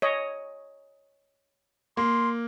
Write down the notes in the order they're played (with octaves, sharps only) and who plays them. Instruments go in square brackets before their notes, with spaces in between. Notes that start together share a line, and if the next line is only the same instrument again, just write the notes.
[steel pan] C#5 D#5
[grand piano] A#3 [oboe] C6